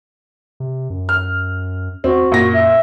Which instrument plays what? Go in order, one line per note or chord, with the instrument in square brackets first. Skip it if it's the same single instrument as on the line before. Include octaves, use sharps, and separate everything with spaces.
[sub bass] C3
F#2
[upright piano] F6
[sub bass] E2 [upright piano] C4 [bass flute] F#4
[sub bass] F#2 [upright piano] A#2 A#6
[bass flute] E5